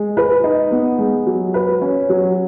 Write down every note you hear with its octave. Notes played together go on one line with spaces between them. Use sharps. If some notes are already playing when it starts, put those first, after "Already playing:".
Already playing: G#3
B4
D#4
B3
G#3
F#3
B4
C#4
F#3